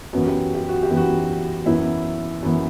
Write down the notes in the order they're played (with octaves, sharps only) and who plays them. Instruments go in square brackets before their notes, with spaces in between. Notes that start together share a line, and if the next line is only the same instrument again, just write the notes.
[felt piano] F#2 E3 B3 [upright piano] F#4
[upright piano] G4
F#4
G4
F#4
G4
[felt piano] F#2 E3 B3
[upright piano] F#4
[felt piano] F#2 E3 B3 [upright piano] E4
[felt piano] F#2 E3 B3